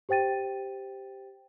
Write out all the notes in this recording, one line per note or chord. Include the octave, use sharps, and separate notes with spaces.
G4 C5 G5 A6 D#7